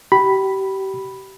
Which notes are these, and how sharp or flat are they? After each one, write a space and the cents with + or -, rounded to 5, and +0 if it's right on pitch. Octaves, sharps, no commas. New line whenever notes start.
G4 -30 B5 +0